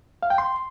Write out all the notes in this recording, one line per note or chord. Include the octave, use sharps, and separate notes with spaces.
F5
G5
C6